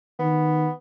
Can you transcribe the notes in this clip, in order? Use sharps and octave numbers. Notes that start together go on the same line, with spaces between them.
D#3 B3